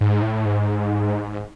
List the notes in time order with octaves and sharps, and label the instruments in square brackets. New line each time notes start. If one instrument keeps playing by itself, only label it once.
[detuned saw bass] G#2
A2
G#2